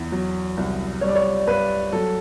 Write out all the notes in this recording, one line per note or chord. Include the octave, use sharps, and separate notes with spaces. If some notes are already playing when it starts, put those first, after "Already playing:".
Already playing: E2
F#3
C2
G3 C#5
D5
C#5
G2 B4
F#3 A4